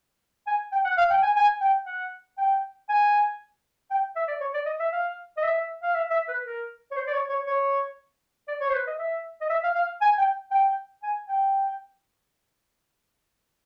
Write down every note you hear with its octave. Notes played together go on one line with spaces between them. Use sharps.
G#5
G5
F#5
F5
G5
G#5
G#5
G5
F#5
G5
G#5
G5
E5
D5
C#5
D5
D#5
E5
F5
D#5
E5
F5
E5
E5
B4
A#4
C#5
C5
D5
C#5
C#5
C#5
D5
C#5
C5
B4
D#5
E5
D#5
E5
F5
F5
G#5
G5
G5
G#5
G5